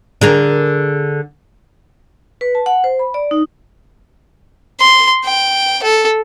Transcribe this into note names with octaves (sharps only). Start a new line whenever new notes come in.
D3 G#4 A#4
B4
A5
F#5
C5
B5
D5
D#4
C6
G5
A4